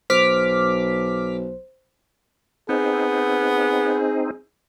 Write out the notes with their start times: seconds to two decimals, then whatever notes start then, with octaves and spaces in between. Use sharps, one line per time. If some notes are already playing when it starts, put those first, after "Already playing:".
0.10 B1 C5 D6 F6 B6
2.69 B3 C4 D#4 G#4